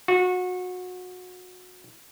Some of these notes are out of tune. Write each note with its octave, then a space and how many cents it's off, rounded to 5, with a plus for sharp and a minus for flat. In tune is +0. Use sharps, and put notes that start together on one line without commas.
F#4 -25